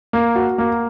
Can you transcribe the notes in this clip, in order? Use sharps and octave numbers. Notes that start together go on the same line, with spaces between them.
A#3
F#4
A#3